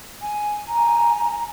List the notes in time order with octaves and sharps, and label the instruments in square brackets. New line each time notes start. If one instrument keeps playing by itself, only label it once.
[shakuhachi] G#5
[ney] A#5